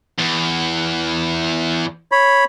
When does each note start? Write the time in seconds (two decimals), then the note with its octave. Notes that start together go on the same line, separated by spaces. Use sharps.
0.19 E2
2.12 C#5 B5